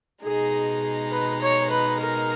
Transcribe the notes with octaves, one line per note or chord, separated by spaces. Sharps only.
B2 G#3 D#4 G#4
B4
C#5
B4
A#4